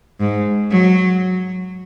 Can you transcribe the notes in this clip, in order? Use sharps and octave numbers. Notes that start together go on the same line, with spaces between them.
G#2
F#3